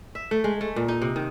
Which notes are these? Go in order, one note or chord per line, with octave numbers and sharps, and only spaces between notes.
E5
A3
G#3
A3
A#2
D#4
C3
D#3